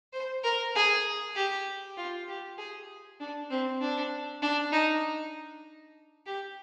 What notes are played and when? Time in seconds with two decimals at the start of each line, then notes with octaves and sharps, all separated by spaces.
0.13 C5
0.44 A#4
0.75 G#4
1.35 G4
1.97 F4
2.28 G4
2.58 G#4
3.20 D4
3.50 C4
3.81 D4
4.42 D4
4.72 D#4
6.26 G4